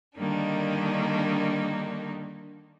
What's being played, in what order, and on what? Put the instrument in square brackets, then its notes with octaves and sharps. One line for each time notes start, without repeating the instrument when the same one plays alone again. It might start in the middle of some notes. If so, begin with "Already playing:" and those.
[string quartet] D3 D#3 G3 A#3 D4 D#4